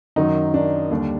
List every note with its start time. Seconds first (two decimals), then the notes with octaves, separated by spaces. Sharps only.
0.16 F#2 D#3 F#3 D#4
0.54 D4
0.91 D#2 D3 G3 D4